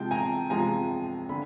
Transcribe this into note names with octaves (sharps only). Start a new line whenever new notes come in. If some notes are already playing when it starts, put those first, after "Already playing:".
Already playing: C3 F3 G#3 G5 A5
G#5 A#5
C3 F3 G#3 G#5 A#5
D3 B5